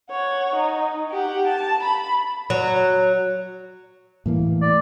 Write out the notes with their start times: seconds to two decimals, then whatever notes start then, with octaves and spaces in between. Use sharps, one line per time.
0.11 C#5 F#5
0.56 D#4
1.12 G4 F#5
1.47 A5
1.83 B5
2.50 F#3
4.26 A2 E3 A#3
4.62 D5